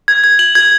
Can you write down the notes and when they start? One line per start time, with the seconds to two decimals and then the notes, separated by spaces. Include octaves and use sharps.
0.08 G#6
0.24 G#6
0.39 F#7
0.55 G#6